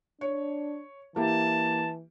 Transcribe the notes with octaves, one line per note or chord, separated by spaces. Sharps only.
D4 C#5
E3 A#3 E4 G4 A5